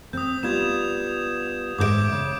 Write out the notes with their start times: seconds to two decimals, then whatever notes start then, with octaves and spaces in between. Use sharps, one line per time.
0.13 C4 D#6 G6
0.43 G3 B3 F4 G#6 E7
1.78 G#2 G#4 E5 D6 G6 D7
2.12 C#3